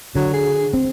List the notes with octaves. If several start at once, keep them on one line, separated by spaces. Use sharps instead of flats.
D3 F#3
G#4
C4